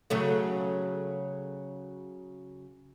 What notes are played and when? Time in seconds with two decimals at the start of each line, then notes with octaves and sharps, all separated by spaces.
0.10 C#3 F#3 A3